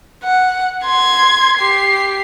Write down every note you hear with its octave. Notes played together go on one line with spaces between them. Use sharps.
F#5
C6 G#6
G4 C7